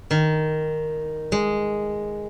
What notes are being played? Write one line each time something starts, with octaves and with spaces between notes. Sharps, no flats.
D#3
G#3